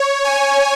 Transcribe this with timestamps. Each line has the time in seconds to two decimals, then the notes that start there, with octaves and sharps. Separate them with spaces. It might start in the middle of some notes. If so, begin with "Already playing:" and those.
Already playing: C#5
0.24 G#5